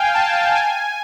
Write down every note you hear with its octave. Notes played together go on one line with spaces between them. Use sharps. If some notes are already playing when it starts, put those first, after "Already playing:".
Already playing: F5 G5 G#5
A5
G#5